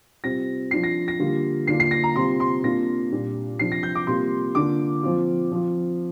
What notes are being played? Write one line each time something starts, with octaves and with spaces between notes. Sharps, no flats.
C3 G3 C4 F4 A#6
F3 D4 F4 C7
A#6
A#6
D3 G3 A#3 F4
D3 A#3 D4 F4 C7
C7
A#6
A#5
C3 G3 C4 F4 C6
C6
C3 A#3 D4 F4 A#6
A#2 G3 D4 F4
C3 F3 D4 F4 C7
A#6
G6
D6
C3 G3 A#3 F4 C6
D3 A#3 D4 F4 D6
F3 C4 F4
F3 C4 F4